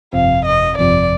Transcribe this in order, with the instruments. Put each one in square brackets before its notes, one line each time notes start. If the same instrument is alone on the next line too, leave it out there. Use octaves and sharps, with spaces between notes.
[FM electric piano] G1 F2 C3 F3 C4 [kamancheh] F5
[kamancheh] D#5
[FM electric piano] G1 F2 C3 F3 C4 [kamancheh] D5